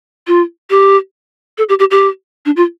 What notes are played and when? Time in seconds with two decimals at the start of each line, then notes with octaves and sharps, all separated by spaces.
0.27 F4
0.70 G4
1.58 A4
1.69 G4
1.79 G4
1.91 G4
2.46 D4
2.56 F4